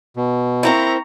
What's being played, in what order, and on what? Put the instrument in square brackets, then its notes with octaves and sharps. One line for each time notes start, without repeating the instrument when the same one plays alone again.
[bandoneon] B2
[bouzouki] A#3 C4 E4 [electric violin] A#5 C#6